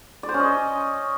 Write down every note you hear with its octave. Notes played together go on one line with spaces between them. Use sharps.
D5
C5
C#4
D#5